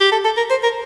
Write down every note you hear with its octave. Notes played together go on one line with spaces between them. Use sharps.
G4
A4
A4
A#4
C5
A#4